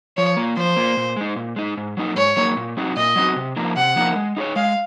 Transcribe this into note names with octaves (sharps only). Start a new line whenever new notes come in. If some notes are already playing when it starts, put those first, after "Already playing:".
F3 C#5
A#3 F4
F3 C5
A#3 F4
A#2
G#3 D#4
A#2
G#3 D#4
G#2
F#3 A#3 D#4
G#2 C#5
F#3 A#3 D#4
A#2
F#3 C4 D#4 F#4
A#2 D#5
F#3 C4 D#4 F#4
C3
F3 A#3 D#4 A#4
C3 F#5
F3 A#3 D#4 A#4
G#3
D#4 G#4 C#5
G#3 F5